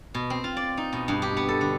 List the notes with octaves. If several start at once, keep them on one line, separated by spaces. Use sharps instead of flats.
B2
C4
F4
D5
D#4
B2
G2
G4
B3
A4
D3